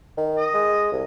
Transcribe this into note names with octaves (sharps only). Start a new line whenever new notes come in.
D#3
D#5
G#3
C2